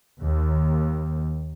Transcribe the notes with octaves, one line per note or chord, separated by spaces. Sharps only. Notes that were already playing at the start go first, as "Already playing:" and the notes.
D#2